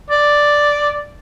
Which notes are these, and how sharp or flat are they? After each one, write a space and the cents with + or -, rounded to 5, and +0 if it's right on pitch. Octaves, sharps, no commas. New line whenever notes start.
D5 +0